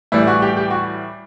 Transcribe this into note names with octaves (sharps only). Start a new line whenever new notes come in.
A2 E3 G3 E4
F#4
G4
G4
F#4